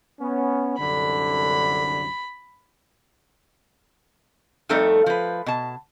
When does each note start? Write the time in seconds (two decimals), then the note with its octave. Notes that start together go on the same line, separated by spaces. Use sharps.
0.20 B3 C#4
0.79 C2 F#2 D3 B5
4.69 F2 G3 A3 D#4 A4
5.06 F3 B4
5.46 B2 A5